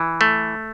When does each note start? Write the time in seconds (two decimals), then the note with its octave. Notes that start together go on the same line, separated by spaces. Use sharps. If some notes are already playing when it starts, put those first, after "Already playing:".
Already playing: E3
0.21 A3